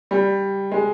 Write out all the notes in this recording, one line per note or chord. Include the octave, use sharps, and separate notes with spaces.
G3
G#3